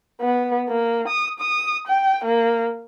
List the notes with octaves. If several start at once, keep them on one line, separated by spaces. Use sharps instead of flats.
B3
A#3
D#6
D#6
G5
A#3